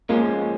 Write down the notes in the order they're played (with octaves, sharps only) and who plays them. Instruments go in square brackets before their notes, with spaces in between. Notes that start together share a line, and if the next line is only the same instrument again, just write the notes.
[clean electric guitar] F3 G#3 C#4 [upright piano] A#3